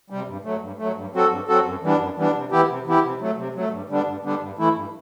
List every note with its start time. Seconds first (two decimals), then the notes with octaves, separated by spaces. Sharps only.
0.10 C3 G3
0.28 G2
0.44 F#3 A3
0.62 G2
0.79 F#3 A3
0.97 G2
1.14 F#3 C4 F#4 A4
1.30 G2
1.48 F#3 C4 F#4 A4
1.66 F#2
1.83 E3 G3 B3 D4
1.99 F#2
2.17 E3 G3 B3 D4
2.35 C3
2.51 E3 B3 E4 G4
2.69 C3
2.86 E3 B3 E4 G4
3.04 C3
3.21 F#3 A3
3.38 C3
3.55 F#3 A3
3.72 G2
3.89 D3 G3 B3 D4
4.07 G2
4.24 D3 G3 B3 D4
4.41 G2
4.59 E3 A3 E4
4.76 G2